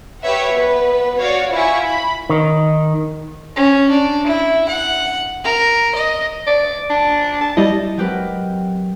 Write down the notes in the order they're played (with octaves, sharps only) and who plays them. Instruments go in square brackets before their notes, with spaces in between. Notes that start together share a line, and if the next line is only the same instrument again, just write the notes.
[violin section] G4 B4 C#5 E5 F#5
B3 B4
F#4 C#5 D5 F5
E4 F4 E5 F#5 G#5 C#6
B5
[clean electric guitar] D#3
[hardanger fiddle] C#4
D4
E4
F#5
A#4
D#5
[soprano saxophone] D5
D4
A5
[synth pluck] G3 E4 [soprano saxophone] D#5
[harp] F#3 G#3 C4 G4 A#4 B4